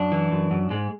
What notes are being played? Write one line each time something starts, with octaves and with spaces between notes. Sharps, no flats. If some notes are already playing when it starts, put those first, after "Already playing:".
Already playing: F#2 D4
E3
F#2
F#2
G#2 G#3